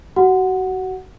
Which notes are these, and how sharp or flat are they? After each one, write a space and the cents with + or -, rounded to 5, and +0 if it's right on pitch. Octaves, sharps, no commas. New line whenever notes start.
F#4 +30 F#5 +0